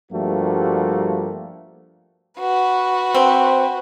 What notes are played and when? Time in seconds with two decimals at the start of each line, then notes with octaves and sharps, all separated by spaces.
0.11 G2 F3 G3 A3 A#3 F#4
2.38 F#4 B4
3.14 C4 C5